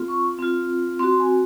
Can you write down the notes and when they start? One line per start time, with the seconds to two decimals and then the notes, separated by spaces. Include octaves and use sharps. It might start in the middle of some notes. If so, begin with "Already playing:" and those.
Already playing: C4 F4
0.08 C#6
0.39 C4 F4
0.99 C4 F#4 C6
1.20 G#5